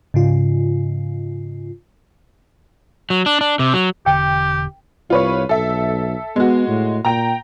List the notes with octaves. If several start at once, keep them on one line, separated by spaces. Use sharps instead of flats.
G#2 C#3 F4
F#3
D4
D4
C3
F#3
E1 D3 G4 G5
C2 F4 B4 C#5
B1 A4 E5
G#3 B3 F#4
A2
A#2 G5 A#5